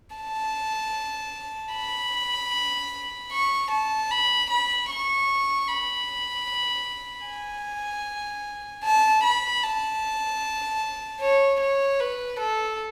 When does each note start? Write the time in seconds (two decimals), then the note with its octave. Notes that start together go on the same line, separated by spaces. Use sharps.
0.16 A5
1.74 B5
3.32 C#6
3.71 A5
4.11 B5
4.51 B5
4.90 C#6
5.68 B5
7.27 G#5
8.84 A5
9.24 B5
9.63 A5
11.21 C#5
11.60 C#5
12.00 B4
12.39 A4